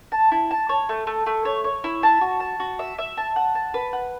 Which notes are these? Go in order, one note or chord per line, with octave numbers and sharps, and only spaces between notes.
A5
E4
A5
C#5
A3
A3
A3
C#5
C#5
E4
A5
F#4
A5
F#4
E5
E5
A5
F#5
A5
B4
F#5